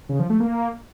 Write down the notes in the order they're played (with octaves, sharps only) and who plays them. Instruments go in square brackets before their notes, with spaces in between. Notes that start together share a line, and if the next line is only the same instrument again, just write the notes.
[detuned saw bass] C#3
F3
A3
A#3